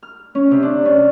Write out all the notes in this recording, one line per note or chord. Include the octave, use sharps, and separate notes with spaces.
F6
C#4
C3
D4
C#4